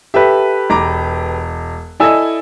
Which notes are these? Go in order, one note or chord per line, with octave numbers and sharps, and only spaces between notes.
G4 A4 B4 E5
E1 A#5 D6
E4 A4 D5 D#5 G#5 E6